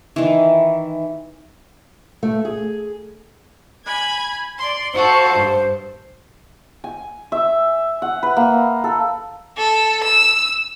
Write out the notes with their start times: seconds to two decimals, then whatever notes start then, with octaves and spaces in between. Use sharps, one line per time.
0.16 D#3 E3
2.23 A3
2.45 G#4
3.85 G#5 B5 G#6
4.59 D5 C6
4.93 F#4 A4 C5 F5
5.34 G2
6.84 G#5
7.32 E5
8.02 F#5
8.23 B4
8.37 A#3
8.84 A4
9.57 A4
10.03 E6